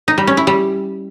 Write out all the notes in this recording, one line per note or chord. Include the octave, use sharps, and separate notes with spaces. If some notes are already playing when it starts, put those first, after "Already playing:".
D#4
G3
C#4
E4
G3